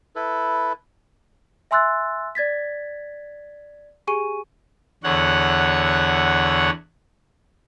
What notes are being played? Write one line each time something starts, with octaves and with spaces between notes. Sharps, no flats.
E4 A4 B4
E5 G#5 C6 E6 F#6 A6
D5 G#6 A6 B6
G4 G#4 G#5 C#6 D#7
E2 D3 C#5 F#5